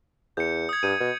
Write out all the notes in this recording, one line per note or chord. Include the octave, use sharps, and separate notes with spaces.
E2 G6 C#7
D#6 G#6
G2 D#7
B2